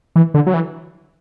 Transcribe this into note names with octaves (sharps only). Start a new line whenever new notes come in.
E3
D3
F#3
E3